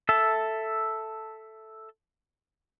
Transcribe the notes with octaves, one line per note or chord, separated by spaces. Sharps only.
A4 E5 A5